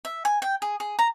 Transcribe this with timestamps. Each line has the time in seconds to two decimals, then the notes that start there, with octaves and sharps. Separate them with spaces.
0.05 E5
0.25 G#5
0.42 G5
0.62 G#4
0.80 G#4
0.99 A#5